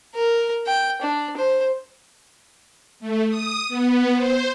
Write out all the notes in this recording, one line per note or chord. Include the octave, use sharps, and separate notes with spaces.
A#4
G5
D4
C5
A3
D#6
B3
C5